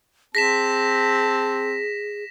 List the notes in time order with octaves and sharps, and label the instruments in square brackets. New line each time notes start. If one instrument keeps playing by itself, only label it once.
[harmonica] C4 A5 [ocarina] G#4 [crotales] A#6 B6 E7